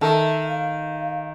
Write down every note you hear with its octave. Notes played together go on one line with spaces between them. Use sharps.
D#3 A4 E5 A5
F5